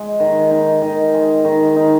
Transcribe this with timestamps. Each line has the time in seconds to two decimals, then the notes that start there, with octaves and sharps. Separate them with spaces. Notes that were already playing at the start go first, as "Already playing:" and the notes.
Already playing: G#3
0.20 D#3
0.51 D#4
0.82 D#3
1.14 G#3
1.45 D#3
1.76 D#4